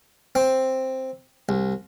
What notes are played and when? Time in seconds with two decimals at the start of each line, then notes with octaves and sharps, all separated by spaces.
0.35 C4
1.49 C2